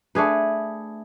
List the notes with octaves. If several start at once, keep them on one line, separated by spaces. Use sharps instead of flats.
A3 D4 G#4 B4